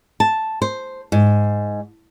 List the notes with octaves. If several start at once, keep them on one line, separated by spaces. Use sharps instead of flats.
A5
C5
G#2